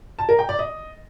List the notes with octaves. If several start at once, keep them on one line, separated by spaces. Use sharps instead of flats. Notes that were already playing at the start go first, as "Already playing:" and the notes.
A5
A#4
G5
D5
D#5